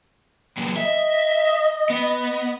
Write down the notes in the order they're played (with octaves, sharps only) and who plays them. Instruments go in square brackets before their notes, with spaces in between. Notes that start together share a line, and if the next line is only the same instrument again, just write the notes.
[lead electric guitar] A#2 F#3
[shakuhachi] D#5 [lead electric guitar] E5
[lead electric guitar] B3